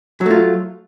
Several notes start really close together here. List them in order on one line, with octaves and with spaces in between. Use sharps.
F#3 A3 F4